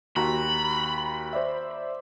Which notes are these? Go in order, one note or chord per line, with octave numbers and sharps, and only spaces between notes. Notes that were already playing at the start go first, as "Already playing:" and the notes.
D#2 F#4 A#5 B5
C5 D5 E5